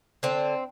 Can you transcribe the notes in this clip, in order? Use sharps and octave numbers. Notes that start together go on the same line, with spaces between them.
D3 C4